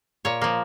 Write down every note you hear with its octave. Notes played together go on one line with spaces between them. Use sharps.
A#2 C#5
F3 A#3